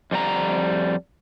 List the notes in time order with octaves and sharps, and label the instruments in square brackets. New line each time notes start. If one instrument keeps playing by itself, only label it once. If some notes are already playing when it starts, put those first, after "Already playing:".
[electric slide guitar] F2 G3 F4 A#5